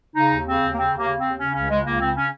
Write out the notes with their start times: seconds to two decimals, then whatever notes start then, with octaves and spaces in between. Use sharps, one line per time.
0.15 C#3 D#4
0.31 D#2
0.46 C#3 C4
0.62 D#2
0.73 A#3
0.77 C#3 C4
0.92 D#2 A#3
1.08 C#3
1.18 D#2 C4
1.39 C#3 C#4
1.54 C#2 C#4
1.69 C#3 G#3
1.85 C#2 A#3
2.00 C#3 C4
2.16 C#4